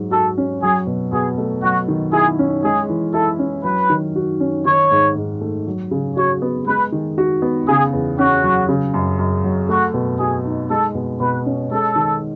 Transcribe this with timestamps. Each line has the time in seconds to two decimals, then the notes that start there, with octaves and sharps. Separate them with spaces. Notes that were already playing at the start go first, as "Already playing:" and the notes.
Already playing: G#2 F#3
0.11 F#4 A4
0.38 C#4
0.63 F#3 G#4
0.87 B2
1.12 B2 G#4
1.38 A3
1.62 F#3 F#4
1.88 D#3
2.13 E4 G#4
2.39 C#4
2.64 G#3 G#4
2.89 E3
3.14 E4 A4
3.39 C#4
3.64 F#3 B4
3.90 D#3
4.16 F#4
4.40 C#4
4.65 D#3 C#5
4.91 G#2
5.16 G#2
5.41 A3
5.67 F#3
5.91 C#3
6.17 F#4 C#5
6.42 B3
6.67 G#3 B4
6.92 D#3
7.18 F#4
7.42 B3
7.68 C#3 G#4
7.93 E2
8.19 C#4 F#4
8.43 F#3
8.69 C#3
8.94 F#2
9.19 F#2
9.44 F#3
9.69 A3 F#4
9.94 B2
10.20 F#4 G#4
10.45 D#4
10.70 G#3 A4
10.95 B2
11.20 B2 B4
11.46 C#4
11.71 G#3 A4
11.96 D#3